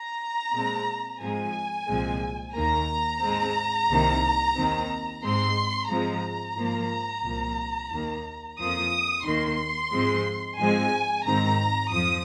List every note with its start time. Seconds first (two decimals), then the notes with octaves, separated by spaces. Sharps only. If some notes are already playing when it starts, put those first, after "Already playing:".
Already playing: A#5
0.54 A#2 G#3 C4
1.21 G#2 F3 G#3 C4 G#5
1.89 C2 A#2 F3 G#3 C4
2.55 D#2 D#3 A#3 A#5
3.22 G#2 G#3 C4
3.89 C2 C3 D#3 A#3
4.57 D#2 D#3 C4
5.23 G#2 G#3 C4 C6
5.90 G#2 F3 G#3 C4 A#5
6.57 G#2 F3 A#3
7.24 C2 A#2 F3 A#3
7.91 D#2 D#3 A#3
8.58 F2 F3 A#3 D#6
9.25 D#2 D#3 A#3 C6
9.92 G#2 F3 G#3 C4
10.59 G#2 F3 G#3 C4 G#5
11.26 G#2 D#3 C4 A#5
11.93 F2 F3 D#6